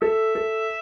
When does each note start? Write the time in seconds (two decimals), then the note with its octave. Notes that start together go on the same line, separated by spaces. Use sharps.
0.02 A4 E5
0.35 A4